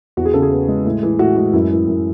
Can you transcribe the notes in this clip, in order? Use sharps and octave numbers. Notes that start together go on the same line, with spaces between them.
E2 F#4
G#4
C#3 A4
G#4
B3
G#3
A2
E3
A2 F#4
G#3 F#4
F#2 E4
E3
F#2